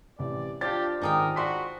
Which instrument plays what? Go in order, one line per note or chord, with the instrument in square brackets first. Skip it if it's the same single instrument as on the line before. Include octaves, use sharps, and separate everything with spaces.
[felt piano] A1 C3 [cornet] D5
[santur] F3 D4 F5 [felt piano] F4 A6 [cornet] G4
[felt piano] G#1 D#3 [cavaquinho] D#4 G#4 G5 [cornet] A#4
[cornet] F#4 [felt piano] D5 C6 B6